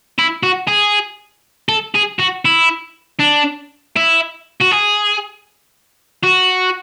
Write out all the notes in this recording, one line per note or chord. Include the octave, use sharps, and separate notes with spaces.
E4
F#4
G#4
A4
G#4
F#4
E4
D4
E4
F#4
G#4
F#4